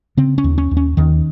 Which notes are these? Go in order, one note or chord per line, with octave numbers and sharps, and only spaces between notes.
C#3 C4
C#4
D#2
C#4
D#2
C#4
D#2 D#3